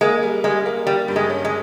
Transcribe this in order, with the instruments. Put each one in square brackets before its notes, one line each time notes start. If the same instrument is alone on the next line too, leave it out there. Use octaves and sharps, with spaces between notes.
[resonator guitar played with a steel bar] G#3 [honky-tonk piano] A#3
[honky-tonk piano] G3
[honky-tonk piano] G3 [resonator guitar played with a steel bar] G#3
[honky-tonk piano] A#3
[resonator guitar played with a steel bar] G3 [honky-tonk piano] A#3
[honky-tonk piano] G2
[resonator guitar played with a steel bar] G#3
[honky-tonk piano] C#4
[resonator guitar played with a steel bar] G#3